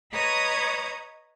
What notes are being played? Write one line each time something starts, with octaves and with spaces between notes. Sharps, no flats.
B4 C#5 D#5 A#5 D#6 G#6